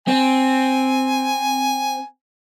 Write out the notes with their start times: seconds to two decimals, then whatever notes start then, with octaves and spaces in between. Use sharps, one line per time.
0.08 C4 G#5